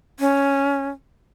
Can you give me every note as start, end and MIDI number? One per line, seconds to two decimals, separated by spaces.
0.20 0.88 61